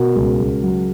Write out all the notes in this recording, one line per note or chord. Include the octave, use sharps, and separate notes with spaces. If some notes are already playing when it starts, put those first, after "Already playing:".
Already playing: B2 F#4 A#4
C#2
C#2
F#3